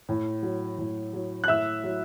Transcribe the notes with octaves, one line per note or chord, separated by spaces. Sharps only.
A2
F#3
A2
F#3
F#6
A2 E5 E6
F#3